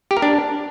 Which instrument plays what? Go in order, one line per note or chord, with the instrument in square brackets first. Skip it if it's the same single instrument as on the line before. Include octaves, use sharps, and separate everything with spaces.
[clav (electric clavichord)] G4
A#4
D4